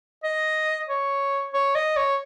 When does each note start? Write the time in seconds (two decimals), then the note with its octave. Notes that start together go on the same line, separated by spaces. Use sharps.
0.24 D#5
0.89 C#5
1.54 C#5
1.75 D#5
1.97 C#5